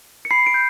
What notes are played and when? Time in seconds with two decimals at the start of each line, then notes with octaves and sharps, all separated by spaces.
0.25 C#7
0.31 B5 C7
0.46 D7
0.54 G6